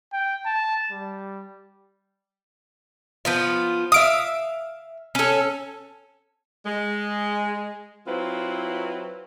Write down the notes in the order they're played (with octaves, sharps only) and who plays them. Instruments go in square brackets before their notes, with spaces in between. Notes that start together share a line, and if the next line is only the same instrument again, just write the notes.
[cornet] G5
A5
G3
[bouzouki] F3 B3 F4
[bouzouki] E5 F5 [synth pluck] D#6 D7
[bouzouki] C#4 A4
[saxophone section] G#3
F#3 C4 E4 F4 B4